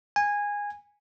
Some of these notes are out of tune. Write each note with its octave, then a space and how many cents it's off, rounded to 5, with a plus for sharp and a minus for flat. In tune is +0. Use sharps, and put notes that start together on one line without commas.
G#5 -15